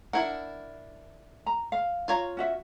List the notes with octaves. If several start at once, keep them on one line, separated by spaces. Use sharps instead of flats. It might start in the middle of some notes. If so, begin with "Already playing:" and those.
D4 E4 A#4 F#5
A#5
F5
F4 C#5 A#5
C#4 F#4 E5